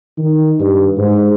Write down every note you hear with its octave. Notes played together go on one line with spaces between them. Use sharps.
D#3
G2
G#2